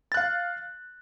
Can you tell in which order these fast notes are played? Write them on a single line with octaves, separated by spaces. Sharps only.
A6 F#6 F5